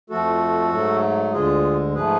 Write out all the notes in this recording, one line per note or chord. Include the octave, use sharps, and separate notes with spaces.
F2 F3 A3 F#4 A4
G#2 F#3 A3
D2 D3 G#3 F4 G#4
G#2 F3 A3 G#4 B4